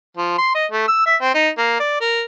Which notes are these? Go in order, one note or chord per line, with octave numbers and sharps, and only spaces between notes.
F3
C6
D#5
A3
E6
E5
C4
D#4
A#3
D5
A#4